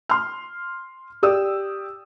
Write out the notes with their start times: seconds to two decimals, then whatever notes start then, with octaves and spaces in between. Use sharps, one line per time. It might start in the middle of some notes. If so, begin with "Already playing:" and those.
0.09 C6 F6
1.23 G4 D5 D#6 E6